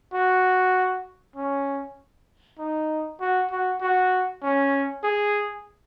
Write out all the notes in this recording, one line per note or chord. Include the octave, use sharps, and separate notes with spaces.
F#4
C#4
D#4
F#4
F#4
F#4
C#4
G#4